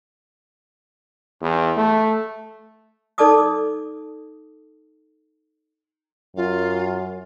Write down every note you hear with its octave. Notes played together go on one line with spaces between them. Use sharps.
E2
A3
D#4 A4 D5 A5 D6 D#6
F#2 F4